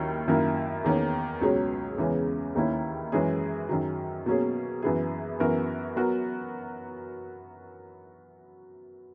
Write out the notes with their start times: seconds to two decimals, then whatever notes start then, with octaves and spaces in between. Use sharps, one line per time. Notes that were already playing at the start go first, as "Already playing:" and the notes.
Already playing: D#2 D#3 F#3 C#4 E4
0.28 F#2 D#3 A#3 E4 A#4
0.84 E2 D#3 A#3 C#4
1.41 C#2 B2 F#3 C#4 G#4
1.98 E2 C#3 E3 G#3 C#4
2.55 D#2 D#3 A#3 C#4 E4
3.12 F#2 E3 G#3 C#4 G#4
3.69 F#2 D#3 F#3
4.26 B2 F#3 A#3 C#4 G#4
4.82 F#2 E3 B3 E4 G#4
5.39 F#2 E3 B3 F#4 A#4
5.96 F#3 B3 F#4 A#4